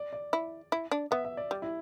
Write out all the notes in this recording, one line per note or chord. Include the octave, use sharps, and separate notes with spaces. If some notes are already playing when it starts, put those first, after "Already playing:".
Already playing: D5
D5
E4
E4
D4
B3 E5
E5
D5
G3
E4